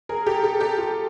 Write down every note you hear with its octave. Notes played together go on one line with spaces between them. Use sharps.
G#4 A#4
G4 A4
G4 A4
G4 A4
F4 G4